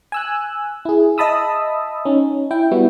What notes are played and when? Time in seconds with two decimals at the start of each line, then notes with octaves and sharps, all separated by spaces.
0.12 G#5 E6 F#6
0.85 E4 G#4
1.18 D#5 E5 A5 B5 D#6 E6
2.05 C#4 D#4
2.51 E4 G5
2.71 G3 B3 E4 F#4